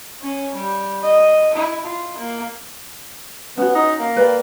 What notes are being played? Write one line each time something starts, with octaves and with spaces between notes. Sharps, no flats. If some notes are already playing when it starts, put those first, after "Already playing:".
C#4
G3
D#5
E4
F4
A#3
B3 C#4 F#4
D#4
A#3
B4 D5 G5